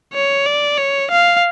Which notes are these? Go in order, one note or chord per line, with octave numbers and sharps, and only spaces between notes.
C#5
D5
C#5
F5